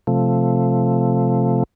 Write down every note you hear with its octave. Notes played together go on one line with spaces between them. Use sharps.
C3 F3 A3